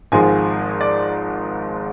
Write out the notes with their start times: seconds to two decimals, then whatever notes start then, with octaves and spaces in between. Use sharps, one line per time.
0.12 G#1 G#2 F3 G#3 G#5
0.81 D5